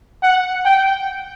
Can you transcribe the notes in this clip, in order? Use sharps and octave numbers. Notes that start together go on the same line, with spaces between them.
F#5
G5